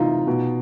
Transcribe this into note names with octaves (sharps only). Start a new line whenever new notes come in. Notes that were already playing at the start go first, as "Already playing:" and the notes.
Already playing: C3 E3 D#4 F4
B2